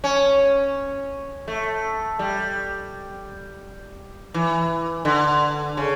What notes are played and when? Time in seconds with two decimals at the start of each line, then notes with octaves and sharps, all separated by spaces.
0.04 C#4
1.48 A3
2.19 G3
4.34 E3
5.05 D3
5.77 C#3